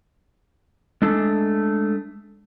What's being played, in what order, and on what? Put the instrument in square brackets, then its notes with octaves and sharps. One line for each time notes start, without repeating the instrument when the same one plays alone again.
[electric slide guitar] G#3 A3 D4 A4